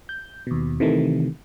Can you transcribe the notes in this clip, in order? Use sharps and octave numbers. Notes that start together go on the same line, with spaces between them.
G6
D#2 B2
C3 D#3 E3 A3